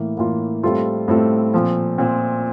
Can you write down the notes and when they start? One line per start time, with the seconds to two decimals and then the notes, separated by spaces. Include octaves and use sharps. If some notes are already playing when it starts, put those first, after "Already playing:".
Already playing: A2 E3 A#3
0.17 A2 E3 A#3 F4
0.63 A2 G3 C4 F4 A4
1.08 A2 G3 C4 F4 A4
1.54 A#2 F3 C4
1.98 A#2 F3 C4